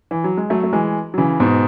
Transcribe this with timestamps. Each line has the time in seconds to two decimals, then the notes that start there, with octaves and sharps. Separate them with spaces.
0.11 E3
0.24 F#3
0.37 G#3
0.50 F#3 A3
0.63 A3
0.73 E3 G#3
1.14 F#3
1.18 C#3 E3
1.40 G#2 B2